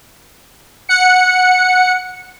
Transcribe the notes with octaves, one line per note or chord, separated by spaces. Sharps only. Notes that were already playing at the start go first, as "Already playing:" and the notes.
F#5 C#7